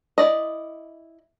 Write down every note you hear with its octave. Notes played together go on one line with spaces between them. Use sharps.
E4 D5 D#5